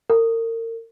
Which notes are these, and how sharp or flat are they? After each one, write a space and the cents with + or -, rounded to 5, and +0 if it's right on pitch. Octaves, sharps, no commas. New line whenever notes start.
A#4 -35